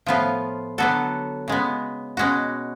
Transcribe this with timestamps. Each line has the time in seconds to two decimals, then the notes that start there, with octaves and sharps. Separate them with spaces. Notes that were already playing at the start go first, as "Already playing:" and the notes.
0.06 A2 F3 B3 F4
0.78 D3 F#3 B3 F#4 A4
1.48 C#3 G#3 B3
2.17 B2 G#3 C#4 F#4